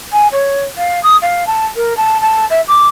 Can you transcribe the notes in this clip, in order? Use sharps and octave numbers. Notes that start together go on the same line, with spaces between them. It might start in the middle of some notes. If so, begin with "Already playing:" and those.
G#5
C#5
F5
D#6
F5
A5
A#4
A5
A5
E5
D6